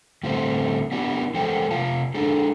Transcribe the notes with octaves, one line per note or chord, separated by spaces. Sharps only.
A2 D3 G3 A3 C4 C5
B3 D4 E4 G4
E3 G#3 A4 C5 G5
C3 F4 F5 A5
G#3 D4 G#4 A4